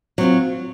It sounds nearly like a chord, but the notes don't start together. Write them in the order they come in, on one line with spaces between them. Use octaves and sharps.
F#3 C4 F4